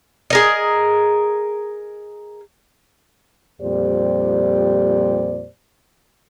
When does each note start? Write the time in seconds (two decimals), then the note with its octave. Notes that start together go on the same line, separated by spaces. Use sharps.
0.30 G#4 A#4 D#5
3.62 F2 A#2 G3 G4 C5 D5